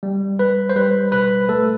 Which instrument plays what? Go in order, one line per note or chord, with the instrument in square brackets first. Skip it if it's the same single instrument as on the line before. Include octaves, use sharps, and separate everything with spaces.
[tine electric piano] G3
G3 B4
C5
G3 B4
B2 B4
A3 A4